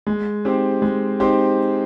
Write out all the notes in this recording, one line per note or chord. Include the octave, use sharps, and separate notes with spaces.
G#3
C4 D#4 G4 C5
G#3
C4 D#4 G4 C5